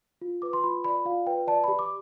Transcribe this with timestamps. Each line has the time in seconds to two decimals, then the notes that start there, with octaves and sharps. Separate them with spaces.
0.22 F4
0.42 B4 D6
0.53 C6
0.63 F4 B5
0.84 D5 B5
1.05 F4 F5
1.27 B4 G5
1.47 D5 A5
1.64 G4 B5
1.79 D6